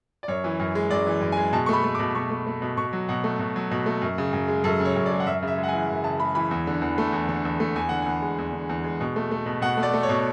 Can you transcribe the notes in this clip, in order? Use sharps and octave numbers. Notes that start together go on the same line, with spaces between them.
D5
F#2 C#5
E3
F#2
G#3
F#2 D5
E3
F#2
G#5
G#3
B2 A5
C#6
A3 B5
A3
D6
B2
B2 C#6
A3
A3
B2
B2 C#6
F#3
B2 F#5
A3
B2
F#3
B2
A3
F#2
C#3
F#2
G#3
F#2 A4
C#3
C#5
F#2
D5
G#3
F#5
F#2 E5
C#3 E5
G#3
F#5
G#5
E3
F#2
C#3 A5
G#3 B5
E3 B5
E2
D3
E2
A3
E2
D3
E2
A3
E2 G#5
D3 F#5
E2 G#5
G#3
E2
D3
E2
G#3
B2
A3
A3
B2
B2 F#5
A3
D5
A3
C#5
B2